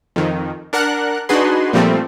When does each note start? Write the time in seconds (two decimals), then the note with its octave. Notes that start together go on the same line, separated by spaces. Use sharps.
0.16 F2 D#3
0.73 D4 A#4 F#5 F#6
1.29 D4 D#4 F#4 G#4 B4 C6
1.73 A#2 F3 G3 A3 C4